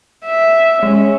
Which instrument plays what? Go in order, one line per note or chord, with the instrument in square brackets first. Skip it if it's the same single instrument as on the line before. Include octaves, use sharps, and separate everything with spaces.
[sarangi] E5
[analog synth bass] G#3 [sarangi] C#4